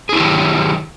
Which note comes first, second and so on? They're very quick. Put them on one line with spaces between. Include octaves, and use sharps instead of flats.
G#4 E4 G4 D#3 F#3